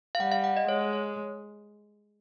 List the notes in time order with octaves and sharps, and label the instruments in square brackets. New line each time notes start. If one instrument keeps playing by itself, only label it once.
[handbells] F5
[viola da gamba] G3 [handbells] F#5
[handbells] F5
F#5
D#5
[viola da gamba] G#3 [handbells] C#5
[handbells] C#5
C#5